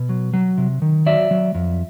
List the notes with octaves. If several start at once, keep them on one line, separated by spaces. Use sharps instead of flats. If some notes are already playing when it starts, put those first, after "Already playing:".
Already playing: B2
F#3
F#3
C3
D#3
F#3 D5 E5
F#3
F2